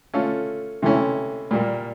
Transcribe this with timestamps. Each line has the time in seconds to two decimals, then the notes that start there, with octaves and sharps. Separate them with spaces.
0.14 A3 C#4 F4 A4
0.82 C3 E3 A3 C#4 E4
1.51 A#2 G3 A#3